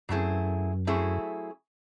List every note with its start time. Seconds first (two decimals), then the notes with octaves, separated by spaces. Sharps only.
0.09 F#2 F#3 A3 C4 E4 G#4
0.87 F#3 A3 C4 E4 G#4